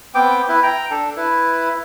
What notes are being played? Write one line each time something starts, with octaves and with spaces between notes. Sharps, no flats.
B3 C4 G5 D6
E4 B4
G5 A#5
D4 A4
E4 B4